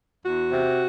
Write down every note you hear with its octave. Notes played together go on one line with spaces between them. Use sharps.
E2 F#4
C3